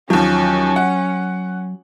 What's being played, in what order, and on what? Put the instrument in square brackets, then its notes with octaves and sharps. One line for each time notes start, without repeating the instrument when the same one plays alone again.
[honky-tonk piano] D#2 F3 [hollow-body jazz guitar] F#3 [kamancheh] C#4
[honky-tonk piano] F#5